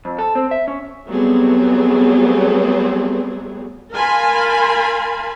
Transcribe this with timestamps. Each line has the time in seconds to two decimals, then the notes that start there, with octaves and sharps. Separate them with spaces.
0.05 F2
0.19 A4
0.35 C4
0.51 E5
0.68 C#4
1.08 F#3 G3 A3 B3 C4 G#4
3.94 A#4 F5 G#5 A5 B5 C6